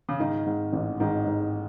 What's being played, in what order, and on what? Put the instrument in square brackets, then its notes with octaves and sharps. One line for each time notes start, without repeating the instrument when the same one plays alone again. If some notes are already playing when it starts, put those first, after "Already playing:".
[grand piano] C#3
[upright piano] G#2 [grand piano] D#3
[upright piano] G#2
A1
[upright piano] G#2 [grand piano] D#3
[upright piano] G#2